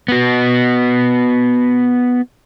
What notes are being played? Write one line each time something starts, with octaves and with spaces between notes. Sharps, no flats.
B3 F#4